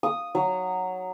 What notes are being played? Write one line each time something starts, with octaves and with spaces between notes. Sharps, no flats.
D#6
F#3